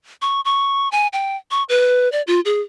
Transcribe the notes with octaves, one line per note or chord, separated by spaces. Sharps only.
C#6
C#6
G#5
G5
C#6
B4
D5
F4
G#4